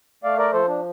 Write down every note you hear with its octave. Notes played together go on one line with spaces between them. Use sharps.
A3 D5 F5
A#4 D5
F3 A4 C5
D4